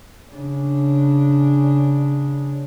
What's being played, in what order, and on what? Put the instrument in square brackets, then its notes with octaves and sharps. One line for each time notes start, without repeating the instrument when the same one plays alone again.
[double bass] C#3 D4